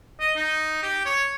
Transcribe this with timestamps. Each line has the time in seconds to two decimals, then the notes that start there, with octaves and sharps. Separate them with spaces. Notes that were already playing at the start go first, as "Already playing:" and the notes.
0.20 D#5
0.36 D#4
0.83 G4
1.05 C#5